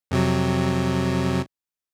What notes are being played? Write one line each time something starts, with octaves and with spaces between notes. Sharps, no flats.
F2 C3 F#3